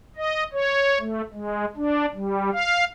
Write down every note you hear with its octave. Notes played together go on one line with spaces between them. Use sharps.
D#5
C#5
A3
G#3
D4
G3
F5